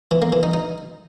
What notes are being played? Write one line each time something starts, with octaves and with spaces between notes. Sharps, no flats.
E3
A#3
E3
D#4
D#4